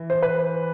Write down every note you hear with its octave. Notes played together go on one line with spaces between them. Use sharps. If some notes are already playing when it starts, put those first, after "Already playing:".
Already playing: E3
C5
B4